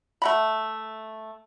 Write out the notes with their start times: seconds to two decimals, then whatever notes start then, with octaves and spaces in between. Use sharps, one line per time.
0.22 A3 F#5 B5